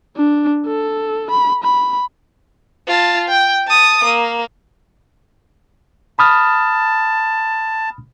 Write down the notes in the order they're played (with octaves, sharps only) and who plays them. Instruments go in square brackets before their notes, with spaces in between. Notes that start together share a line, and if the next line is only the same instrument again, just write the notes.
[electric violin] D4
A4
B5
B5
[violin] F4 A5
G5
A5 D#6
A#3
[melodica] A5 [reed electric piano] B5 D#6 F6